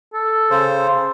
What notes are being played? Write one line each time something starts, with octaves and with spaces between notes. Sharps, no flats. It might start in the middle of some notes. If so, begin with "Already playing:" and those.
A4
C#3 C5